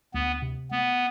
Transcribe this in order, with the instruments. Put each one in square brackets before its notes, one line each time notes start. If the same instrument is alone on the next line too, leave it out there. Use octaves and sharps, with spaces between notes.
[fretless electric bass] D2 [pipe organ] B3
[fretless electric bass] C3
[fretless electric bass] A3 [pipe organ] B3